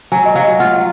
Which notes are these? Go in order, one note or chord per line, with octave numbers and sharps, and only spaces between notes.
F#3 G#5
D#5
F#3 F5
F4 F#5
F#5